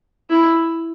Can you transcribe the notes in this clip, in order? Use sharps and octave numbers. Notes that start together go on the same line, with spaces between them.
E4